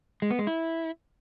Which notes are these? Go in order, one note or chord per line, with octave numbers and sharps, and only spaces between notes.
G#3
B3
G#3
E4